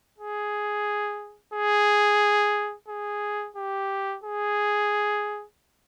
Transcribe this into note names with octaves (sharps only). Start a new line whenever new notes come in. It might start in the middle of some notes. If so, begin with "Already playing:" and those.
G#4
G#4
G#4
G4
G#4